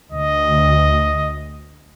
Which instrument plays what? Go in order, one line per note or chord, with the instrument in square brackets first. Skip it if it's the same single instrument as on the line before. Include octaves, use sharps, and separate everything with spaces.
[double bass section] D2 [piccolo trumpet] D#5